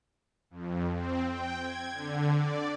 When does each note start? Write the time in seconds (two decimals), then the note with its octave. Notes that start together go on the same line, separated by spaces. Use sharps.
0.51 F2
0.92 C4
1.29 G5
1.60 G#6
1.92 D3
2.32 D5